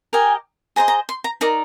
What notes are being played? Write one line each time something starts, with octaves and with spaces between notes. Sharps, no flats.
G4 A#4 D#5 G#5
G#4 C5 D#5 A#5
A#5
C6
A#5
D#4 A#4 D5 A#5